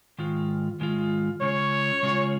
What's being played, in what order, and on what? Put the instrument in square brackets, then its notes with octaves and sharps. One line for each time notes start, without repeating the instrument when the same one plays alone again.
[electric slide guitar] G#2 D#3 G#3 F4
G#2 D#3 G#3 F4
[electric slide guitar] C#3 G#3 C#4 F4 [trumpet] C#5
[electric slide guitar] C#3 G#3 C#4 F4